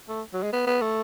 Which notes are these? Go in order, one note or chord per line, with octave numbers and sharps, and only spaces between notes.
A3
F#3
G#3
B3
B3
A3